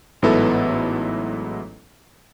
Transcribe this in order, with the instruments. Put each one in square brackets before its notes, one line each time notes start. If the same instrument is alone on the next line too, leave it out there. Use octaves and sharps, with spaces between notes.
[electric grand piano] A1 G#2 F#3 B3 E4 A4